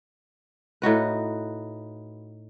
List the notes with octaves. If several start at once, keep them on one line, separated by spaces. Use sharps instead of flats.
A2 D#4 F#4 B4